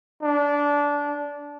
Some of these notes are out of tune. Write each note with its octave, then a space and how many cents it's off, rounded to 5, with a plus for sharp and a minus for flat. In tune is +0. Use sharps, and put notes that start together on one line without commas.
D4 -20